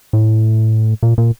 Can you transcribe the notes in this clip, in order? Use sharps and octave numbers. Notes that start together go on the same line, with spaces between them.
A2
A#2
A#2